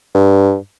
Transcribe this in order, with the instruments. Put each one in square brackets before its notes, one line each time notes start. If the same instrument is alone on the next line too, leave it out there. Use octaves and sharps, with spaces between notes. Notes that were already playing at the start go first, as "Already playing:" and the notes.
[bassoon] G2